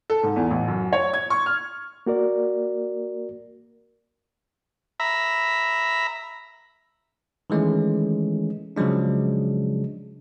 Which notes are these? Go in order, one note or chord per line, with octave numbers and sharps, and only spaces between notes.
A4
G#2
E2
A1
F#2
C#5
G#6
C#6
F6
A#3 F#4 A#4 D5
E5 A#5 B5
D#3 E3 G#3 A3 C#4
C#3 F3 F#3 G#3 D4